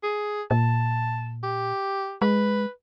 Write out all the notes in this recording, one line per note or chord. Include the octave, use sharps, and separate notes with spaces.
G#4
A#2 A5
G4
G#3 B4